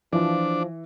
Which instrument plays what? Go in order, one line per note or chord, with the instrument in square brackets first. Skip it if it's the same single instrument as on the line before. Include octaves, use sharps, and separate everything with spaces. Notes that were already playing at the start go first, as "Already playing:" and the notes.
[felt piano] E3 [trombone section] F3 [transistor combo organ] D4